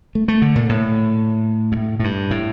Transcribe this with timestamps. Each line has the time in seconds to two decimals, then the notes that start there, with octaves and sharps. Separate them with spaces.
0.15 A3
0.28 A3
0.42 D3
0.55 A#2
0.69 A2
1.72 G2
1.77 A2
2.00 A2
2.04 G2
2.31 A2